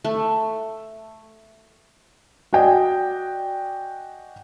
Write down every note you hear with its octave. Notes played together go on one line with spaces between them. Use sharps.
A3
F#4 D5 D#5 G5 G#5